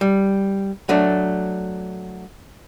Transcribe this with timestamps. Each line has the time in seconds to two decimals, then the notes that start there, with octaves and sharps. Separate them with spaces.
0.01 G3
0.89 F#3 A3 D4